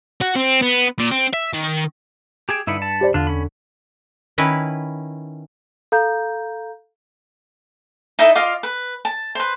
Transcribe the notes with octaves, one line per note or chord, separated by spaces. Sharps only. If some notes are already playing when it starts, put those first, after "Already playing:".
F#4
C4
B3
A#2
C4
E5
D#3
G4 G#4 G#5 E6 D7
G2 D3 D#4 E4 B5 C#7
A5
G4 C5 D5
E2 D3 D4 F4
C#4 B5
D#3 C#4 E4 B4
A4 F5 A#5 G6
D#4 E4 A4 D#5
F4 D#5 F5 D6
B4
A5
B4 C5